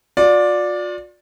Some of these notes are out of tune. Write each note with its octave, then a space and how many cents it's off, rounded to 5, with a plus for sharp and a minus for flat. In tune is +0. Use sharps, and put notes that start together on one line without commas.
F4 +45 D5 +0